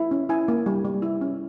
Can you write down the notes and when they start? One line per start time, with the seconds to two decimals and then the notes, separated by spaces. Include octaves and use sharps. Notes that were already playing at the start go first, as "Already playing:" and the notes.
Already playing: E4
0.11 C#4
0.29 E4 G#5
0.48 A#3
0.66 G3
0.85 G3
1.02 E4
1.21 C#4